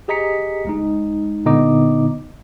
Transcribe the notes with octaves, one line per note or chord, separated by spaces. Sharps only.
G4 G#4 D#5 A#5 B6 C#7
C#2 G#3 D#4
A#2 D3 B3 D#4 D#5 D6